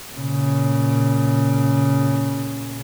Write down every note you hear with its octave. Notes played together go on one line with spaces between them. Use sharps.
A#2 C#3